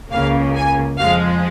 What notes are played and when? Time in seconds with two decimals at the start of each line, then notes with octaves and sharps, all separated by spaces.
0.11 C#2 C#3 A#3 F5
0.55 G#5
0.98 F2 F3 G#3 F5